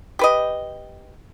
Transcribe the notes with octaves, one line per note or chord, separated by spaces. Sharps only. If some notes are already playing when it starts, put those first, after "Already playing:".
G4 B4 D#5